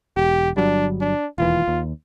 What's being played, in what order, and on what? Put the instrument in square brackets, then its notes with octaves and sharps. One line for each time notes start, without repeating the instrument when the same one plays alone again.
[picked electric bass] E1 [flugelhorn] G4
[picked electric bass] G1 F#3 G3 [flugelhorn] D4
[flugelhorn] D4
[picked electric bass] E1 D#2 E3 [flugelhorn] F4
[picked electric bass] D#2